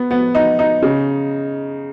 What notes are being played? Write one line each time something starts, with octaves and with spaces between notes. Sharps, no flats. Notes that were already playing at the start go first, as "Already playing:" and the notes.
Already playing: B3
B3
D#4
D#4
C#3